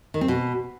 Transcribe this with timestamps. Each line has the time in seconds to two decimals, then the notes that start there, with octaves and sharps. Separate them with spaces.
0.14 D#3
0.21 C4
0.28 B2